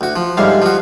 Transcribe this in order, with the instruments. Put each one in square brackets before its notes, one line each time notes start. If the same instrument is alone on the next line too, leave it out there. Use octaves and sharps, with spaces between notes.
[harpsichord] D2 F#4
F3
[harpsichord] G#2 D3 E5 [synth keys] G3 F5
[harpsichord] F3 F#4